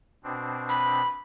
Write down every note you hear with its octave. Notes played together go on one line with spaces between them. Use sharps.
B2 C4 D4
B5